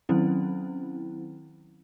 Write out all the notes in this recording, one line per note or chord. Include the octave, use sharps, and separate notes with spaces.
D#3 F#3 C4 C#4 E4